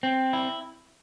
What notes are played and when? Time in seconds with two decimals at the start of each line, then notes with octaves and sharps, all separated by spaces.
0.03 C4
0.33 E4